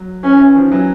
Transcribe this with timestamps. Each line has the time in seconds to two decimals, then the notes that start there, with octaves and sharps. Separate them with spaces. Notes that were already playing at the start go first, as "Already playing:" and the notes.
Already playing: F#3
0.23 E3 C#4
0.39 E3
0.55 D#3 F3
0.72 E3 F#3